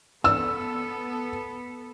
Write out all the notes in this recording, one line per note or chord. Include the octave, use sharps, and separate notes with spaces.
B3 A4 E6